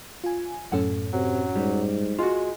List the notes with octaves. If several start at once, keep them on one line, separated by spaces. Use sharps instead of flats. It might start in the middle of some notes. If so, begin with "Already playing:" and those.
F4 G#5
F#2 A2 C#4 A4 F#5
C3 F#3
G#2 G3
G#3 F4 F#4